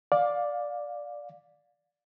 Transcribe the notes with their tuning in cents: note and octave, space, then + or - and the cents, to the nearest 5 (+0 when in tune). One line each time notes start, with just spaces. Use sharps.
D5 +0 F5 +20